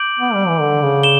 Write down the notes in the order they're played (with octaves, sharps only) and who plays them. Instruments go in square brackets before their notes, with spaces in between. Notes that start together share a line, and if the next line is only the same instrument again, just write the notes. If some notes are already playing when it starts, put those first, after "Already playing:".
Already playing: [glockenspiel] D6 G6 D7 F#7
[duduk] B3
G3
E3
D3
C#3
[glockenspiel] E7 G7